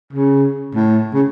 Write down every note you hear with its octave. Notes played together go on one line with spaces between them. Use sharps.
C#3
A2
C#3